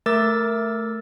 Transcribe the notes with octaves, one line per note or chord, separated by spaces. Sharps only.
A3 A#4 D6 E6 A6